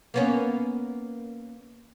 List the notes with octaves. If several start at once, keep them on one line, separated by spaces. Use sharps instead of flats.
A#3 B3 C#4